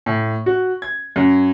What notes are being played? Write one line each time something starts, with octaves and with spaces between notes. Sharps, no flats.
A2
F#4
G#6
F#2